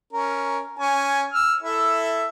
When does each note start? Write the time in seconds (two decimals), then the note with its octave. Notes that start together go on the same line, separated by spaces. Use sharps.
0.13 C#4 A#4
0.79 C#4 G#5
1.33 E6 F6
1.63 E4 A4 E5